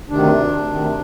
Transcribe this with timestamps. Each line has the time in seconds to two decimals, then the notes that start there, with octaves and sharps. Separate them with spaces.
0.09 D2 C3 D#3 D4
0.67 D2 C3 D#3